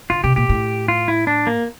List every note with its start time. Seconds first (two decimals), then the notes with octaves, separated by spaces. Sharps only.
0.10 D3 F4
0.24 C3 G4
0.36 A#2 G4
0.49 A2
0.88 F4
1.08 E4
1.27 D4
1.47 A#3